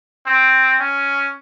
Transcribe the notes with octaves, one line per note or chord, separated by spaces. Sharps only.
C4
C#4